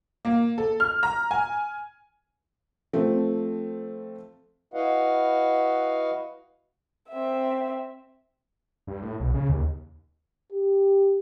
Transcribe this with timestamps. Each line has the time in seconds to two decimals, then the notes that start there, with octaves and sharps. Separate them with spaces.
0.25 A#3
0.58 A4
0.80 F6
1.03 A#5
1.31 G#5
2.93 F3 A3 C4
4.74 E4 F#4 B4 D#5 F5 F#5
7.10 C4 E5
8.87 G2
9.02 A2
9.20 B1
9.34 C#3
9.49 D#2
10.52 G4